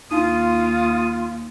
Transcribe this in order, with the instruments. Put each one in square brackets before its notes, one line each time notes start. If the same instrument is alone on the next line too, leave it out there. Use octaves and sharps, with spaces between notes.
[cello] D#2 [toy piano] D4 D#4 [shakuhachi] F4 [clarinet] D#6